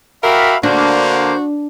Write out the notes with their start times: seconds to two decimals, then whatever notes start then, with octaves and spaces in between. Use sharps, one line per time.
0.23 F#4 G4 A#4 E5 F5 B5
0.63 D3 A#3 D4 F#4 C5